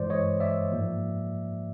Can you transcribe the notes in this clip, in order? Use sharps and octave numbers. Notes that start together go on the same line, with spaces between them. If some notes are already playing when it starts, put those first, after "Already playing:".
Already playing: G2 E3 G#3 C5 D5
C#5 D#5
D5 E5
G#2 F3 A#3